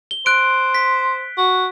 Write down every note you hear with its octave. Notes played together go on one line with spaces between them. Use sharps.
G7
C5 F#6 D7
B6
F#4